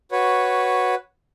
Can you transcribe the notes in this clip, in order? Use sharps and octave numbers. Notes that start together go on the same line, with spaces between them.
F#4 B4 C#5